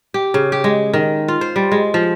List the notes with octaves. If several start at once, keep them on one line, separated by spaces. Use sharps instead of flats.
G4
C#3
G4
G#3
D#3
F4
C5
G3
G#3
F3